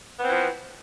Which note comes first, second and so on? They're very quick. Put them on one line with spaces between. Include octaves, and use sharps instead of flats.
B3 C4 E3 F3